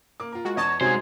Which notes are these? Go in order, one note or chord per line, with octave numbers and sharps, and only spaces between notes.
A#3 D6
F4 A#4
G#3 F#4
E2 C#5 D#5 A5
F#2 C3 F#3 G#3 D#4 C5 G#5